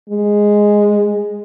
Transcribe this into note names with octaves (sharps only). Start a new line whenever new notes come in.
G#3